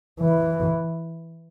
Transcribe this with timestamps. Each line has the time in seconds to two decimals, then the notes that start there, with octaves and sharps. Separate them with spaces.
0.20 E3